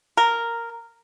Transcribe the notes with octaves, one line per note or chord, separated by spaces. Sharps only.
A#4